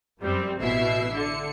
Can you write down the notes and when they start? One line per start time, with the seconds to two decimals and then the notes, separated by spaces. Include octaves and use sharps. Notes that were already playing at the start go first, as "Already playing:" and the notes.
0.21 F#2 G3 C4
0.60 A1 B2 E4 E5 C7
1.14 D3 C#7